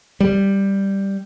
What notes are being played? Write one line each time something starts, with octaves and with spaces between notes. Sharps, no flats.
G3